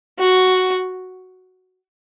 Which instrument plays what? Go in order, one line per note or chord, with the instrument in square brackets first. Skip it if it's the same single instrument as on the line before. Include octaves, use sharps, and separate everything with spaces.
[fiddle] F#4